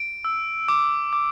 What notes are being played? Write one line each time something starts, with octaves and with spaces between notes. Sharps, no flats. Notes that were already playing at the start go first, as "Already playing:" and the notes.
Already playing: D7
E6
D6
D6